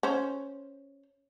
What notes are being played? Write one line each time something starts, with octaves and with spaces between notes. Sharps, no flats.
C#4 C5